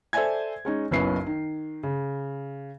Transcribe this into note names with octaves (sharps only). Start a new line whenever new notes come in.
A4 C5 D5 E5 G#5 G#6
G#3 C#4 D#4
F#1 B1 C#4 E4 B4 C7
D#3
C#3